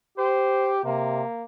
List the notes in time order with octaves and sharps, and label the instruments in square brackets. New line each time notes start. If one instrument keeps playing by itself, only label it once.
[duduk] G4 [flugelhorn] C5
[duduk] C3 [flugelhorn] A#3